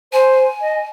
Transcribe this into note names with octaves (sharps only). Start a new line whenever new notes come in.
C5 G#5
D#5